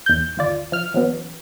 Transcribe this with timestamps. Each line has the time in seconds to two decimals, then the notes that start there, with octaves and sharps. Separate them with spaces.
0.06 E2 G6
0.37 G1 D#2 F4 D5
0.72 F3 F6
0.94 E3 F#3 B3 C#4